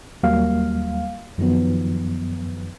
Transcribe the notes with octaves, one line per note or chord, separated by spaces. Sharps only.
D#2 F#3 G3 A#3 F5
F#2 D#3 F3 F#3 B3